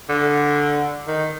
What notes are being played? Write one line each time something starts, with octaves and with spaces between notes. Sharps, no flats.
D3
D#3